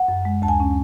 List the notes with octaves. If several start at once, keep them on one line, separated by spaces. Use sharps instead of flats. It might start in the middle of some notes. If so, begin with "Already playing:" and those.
Already playing: F#5
F#2
G#3
D2 A5
G#5
C#4